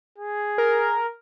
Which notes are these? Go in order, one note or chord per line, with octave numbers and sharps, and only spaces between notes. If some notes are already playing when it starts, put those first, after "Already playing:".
G#4
A#4